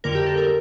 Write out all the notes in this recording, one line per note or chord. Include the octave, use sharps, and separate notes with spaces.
F2 D3 G3 A#3 A#4
G4
A4
A#4